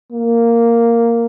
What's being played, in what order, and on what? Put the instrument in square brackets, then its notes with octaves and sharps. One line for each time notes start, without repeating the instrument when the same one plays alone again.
[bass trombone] A#3